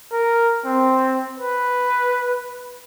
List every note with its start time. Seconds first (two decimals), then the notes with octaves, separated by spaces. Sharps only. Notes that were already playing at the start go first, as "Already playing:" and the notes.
0.13 A#4
0.65 C4
1.38 B4